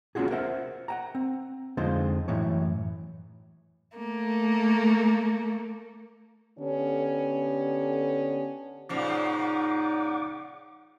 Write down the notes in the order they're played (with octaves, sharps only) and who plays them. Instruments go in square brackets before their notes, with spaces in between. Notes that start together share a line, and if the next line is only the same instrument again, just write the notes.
[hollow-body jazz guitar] A#3 B3 C#4 F4 F#4 G#4
A#4 C5 E5 F#5
F#5 G5 A#5
C4
F2 D3 G#3 D#4 F4 C5
F#2 A2 E3 C#5
[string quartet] A3 A#3
[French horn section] D3 B3 C#4 G4 A4
[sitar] A#2 C#3 F3 [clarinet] D#4 [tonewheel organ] F#5 D6